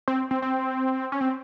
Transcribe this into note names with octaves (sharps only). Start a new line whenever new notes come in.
C4
C4
C4
C#4
C4